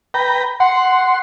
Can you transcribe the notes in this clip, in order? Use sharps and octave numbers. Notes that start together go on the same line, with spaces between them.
B4 G5 A#5
F#5 C6